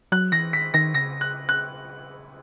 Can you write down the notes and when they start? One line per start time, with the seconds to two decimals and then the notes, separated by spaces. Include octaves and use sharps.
0.12 F#3 F#6
0.32 E3 A#6
0.53 D#3 B6
0.74 D#3 A#6
0.94 C#3 A#6
1.21 F#6
1.49 F#6